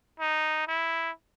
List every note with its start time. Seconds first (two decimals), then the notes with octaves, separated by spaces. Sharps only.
0.20 D#4
0.68 E4